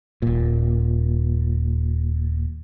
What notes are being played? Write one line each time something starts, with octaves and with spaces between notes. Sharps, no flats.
D#1 A#2